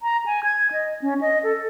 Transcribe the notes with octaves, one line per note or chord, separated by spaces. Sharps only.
A#5
G#5
G#6
D#5
C#4
D#5
A4